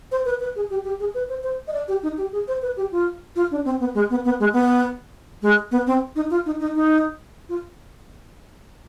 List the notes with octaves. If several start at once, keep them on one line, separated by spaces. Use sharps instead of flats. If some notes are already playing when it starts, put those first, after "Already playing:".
C5
B4
B4
G#4
G4
G4
G#4
B4
C5
C5
D#5
D5
G4
D#4
G4
G#4
C5
B4
G4
F4
F4
D4
C4
B3
G#3
B3
B3
G#3
B3
G#3
B3
C4
D#4
F4
D#4
D#4
D#4
F4